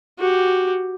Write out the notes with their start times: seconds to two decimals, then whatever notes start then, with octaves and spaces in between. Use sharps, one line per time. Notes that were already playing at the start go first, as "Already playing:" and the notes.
0.19 F#4 G4